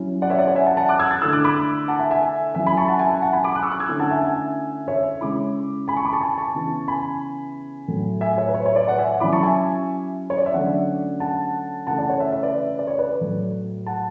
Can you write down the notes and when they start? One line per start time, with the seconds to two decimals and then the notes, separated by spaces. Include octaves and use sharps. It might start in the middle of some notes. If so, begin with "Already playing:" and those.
Already playing: F#3 C#4 E4
0.22 D5 F#5
0.30 C#5 E5
0.38 D5 F#5
0.47 C#5
0.55 E5 G#5
0.66 F#5 A5
0.77 F#5 A5
0.89 D6 F#6
0.99 E6 G#6
1.11 F#6 A6
1.22 D3 A3 E4 E6 G#6
1.33 D6 F#6
1.44 B5 D6
1.88 F#5 A5
1.99 E5 G#5
2.11 E5 G#5
2.55 F#3 C#4 E4 E5 G#5
2.66 G#5 B5
2.77 A5 C#6
2.88 F#5 A5
2.99 E5 G#5
3.10 F#5 A5
3.22 F#5 A5
3.33 G#5 B5
3.44 B5 D6
3.55 D6 F#6
3.63 C#6 E6
3.72 D6 F#6
3.80 E6 G#6
3.89 D3 A3 C#4 E4
4.00 F#5 A5
4.10 E5 G#5
4.21 E5 G#5
4.88 C#5 E5
5.21 C#3 G#3 C#4 E4 B5 D6
5.88 G#5 B5
5.97 A5 C#6
6.05 B5 D6
6.13 A5 C#6
6.21 G#5 B5
6.38 A5 C#6
6.55 C#3 E3 B3
6.88 G#5 B5
7.88 A2 F#3 A3
8.21 E5 G#5
8.38 C#5 E5
8.48 B4
8.54 C#5
8.66 C#5
8.76 B4 D5
8.87 D5 F#5
8.99 E5 G#5
9.20 F#3 C#4 E4 B5 D6
9.33 A5 C#6
9.43 E5 G#5
10.30 C#5
10.37 D5
10.46 E5
10.53 D3 F#3 A3 C#4 D5 F#5
11.20 F#5 A5
11.87 C#3 E3 A3 F#5 A5
11.98 D5 F#5
12.10 C#5
12.20 C#5 E5
12.31 C#5 E5
12.43 B4 D5
12.79 D5
12.87 C#5
12.98 B4 D5
13.21 A2 F#3 A3
13.86 F#5 A5